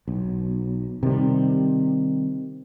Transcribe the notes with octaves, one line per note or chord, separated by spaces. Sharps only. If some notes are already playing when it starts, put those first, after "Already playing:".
B1
C3 D#3 G3